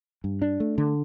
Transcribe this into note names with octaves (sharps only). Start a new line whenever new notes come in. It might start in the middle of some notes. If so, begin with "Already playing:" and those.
G2
D4
A3
D3